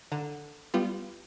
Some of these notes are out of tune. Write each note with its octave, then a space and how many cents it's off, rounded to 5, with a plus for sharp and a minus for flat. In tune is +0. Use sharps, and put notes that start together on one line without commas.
D3 +5 A#5 +0
G3 +0 B3 +0 F4 -20